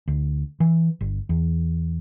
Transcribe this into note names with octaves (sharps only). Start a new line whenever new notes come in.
D2
E3
G1
E2